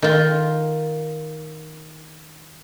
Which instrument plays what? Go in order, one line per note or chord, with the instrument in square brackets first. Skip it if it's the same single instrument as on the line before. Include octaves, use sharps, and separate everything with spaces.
[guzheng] D#3 F4